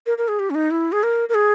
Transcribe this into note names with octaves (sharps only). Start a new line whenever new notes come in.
A#4
A#4
G#4
G4
C#4
D#4
E4
G#4
A#4
A#4
G#4